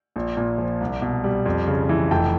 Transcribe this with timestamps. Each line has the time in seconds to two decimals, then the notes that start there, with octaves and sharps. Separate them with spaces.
0.16 A#1
0.37 A#2
0.58 F3
0.81 C2
1.02 B2
1.24 G3
1.46 F2
1.68 C#3
1.89 E3
2.11 F1 G5 A5